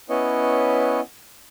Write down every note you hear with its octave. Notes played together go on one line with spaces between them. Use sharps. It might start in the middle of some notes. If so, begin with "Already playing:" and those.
B3 C#4 E4 B4 C#5 D#5